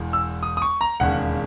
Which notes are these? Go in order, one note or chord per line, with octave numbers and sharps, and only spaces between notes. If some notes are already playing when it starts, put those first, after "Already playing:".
Already playing: E1 E2
E6
D#6
D#6
C#6
A#5
E1 D#2 C#3 F#5